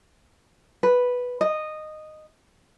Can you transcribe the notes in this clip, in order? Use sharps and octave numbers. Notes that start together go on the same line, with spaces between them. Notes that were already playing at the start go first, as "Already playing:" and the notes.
B4
D#5